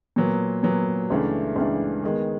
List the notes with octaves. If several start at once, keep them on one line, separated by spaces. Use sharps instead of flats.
A#2 F#3 B3
A#2 F#3 B3
C#2 C#3 E3 A3 D4
C#2 C#3 E3 A3 D4
D#3 G#3 B3